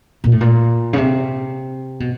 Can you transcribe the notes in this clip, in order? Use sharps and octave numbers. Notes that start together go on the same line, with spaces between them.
A#2
A2
A#2
C#3
C3
B2